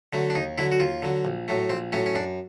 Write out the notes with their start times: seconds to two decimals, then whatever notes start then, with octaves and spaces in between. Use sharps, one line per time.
0.13 D3 F#3 A3
0.30 D4
0.35 D#2 D#4
0.58 D3 F#3 E4
0.72 F#4
0.80 D#2 F4
1.02 D3 F#3
1.25 A#1
1.48 A2 F#3 A3
1.70 A#1 C4
1.92 A2 F#3 A3 C#4
2.06 C#4
2.15 F#2 D4